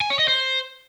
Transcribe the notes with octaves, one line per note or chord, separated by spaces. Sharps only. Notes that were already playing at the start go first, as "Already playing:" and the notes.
G#5
C#5
D#5
C5